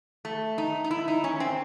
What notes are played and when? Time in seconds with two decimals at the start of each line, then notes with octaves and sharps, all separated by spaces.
0.25 A3
0.58 D#4
0.84 D#4
0.91 E4
1.08 D#4
1.24 C#4
1.40 C4